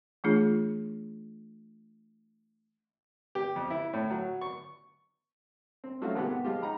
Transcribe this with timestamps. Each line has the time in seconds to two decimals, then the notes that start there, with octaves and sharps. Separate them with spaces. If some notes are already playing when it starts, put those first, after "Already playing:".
0.24 E3 A3 D4 F4 G#4
3.35 G4
3.56 F2
3.70 E4
3.93 A2
4.10 F#3
4.41 C#6
5.84 C4
6.02 F3 F#3 A3 C#4 F4 F#4
6.15 G#2 D#3 B3 C4 G4 F#5
6.31 B3
6.45 F3 G#3 F4 G4
6.62 D#4 F#5 A#5 B5